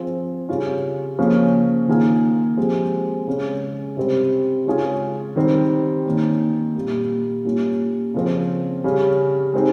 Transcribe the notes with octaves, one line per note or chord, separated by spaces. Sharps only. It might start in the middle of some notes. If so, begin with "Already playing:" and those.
Already playing: F3 C4 F4 G#4
C#3 G3 C#4 F4
C#3 F3 A#3 C#4
D#3 A#3 F4 G#4
F3 G#3 C4 G4
C#3 G#3 C#4
C3 G3 C4
C#3 G#3 C#4 F4 G#4
D#3 G3 C4 G4
D#3 A#3 C#4
A#2 G3 A#3
G3 A#3 C#4 F4
C#3 F3 C4
C#3 G3 C#4
G#3 C4 D#4 G4